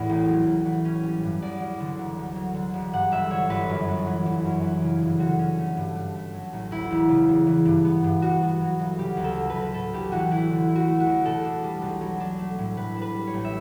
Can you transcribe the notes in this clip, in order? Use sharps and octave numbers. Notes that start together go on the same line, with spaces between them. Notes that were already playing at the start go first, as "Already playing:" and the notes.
Already playing: E2 A2 C#4
A1
F#3
A1
E3
C#4
G3
G2
E2 D5
F#3
D3
E1
D2
F#3
D3
E1
G2 F#5
G1 E5
D3 C#5
G1 B4
F#2
B3
E3
G1
F#2
E3
C#3
G1
D3 F#4
C#4
A3
G2
G2
A3
F#3
A1
D2 E4
E1
C#3
E1
E3
G2
B3
G2
G2 F#4
B3
F#3
G1
C#3 G4
D2
A4
F#3
B4
D2
B4
A2 A4
A1 G4
E3 F#4
A1 E4
D3
E4
F#4
A3
F#4
E2
B2 A4
D4
G3
B1
F#3
D4
A3
A2
A2 B4
D4
B4
G3
C#5
A1
E5